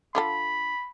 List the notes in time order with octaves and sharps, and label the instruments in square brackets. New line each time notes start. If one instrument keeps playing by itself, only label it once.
[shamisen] D3 F4 A4 [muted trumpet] B5